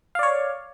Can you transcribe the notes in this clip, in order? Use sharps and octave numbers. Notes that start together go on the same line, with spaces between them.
C#5 D5 F5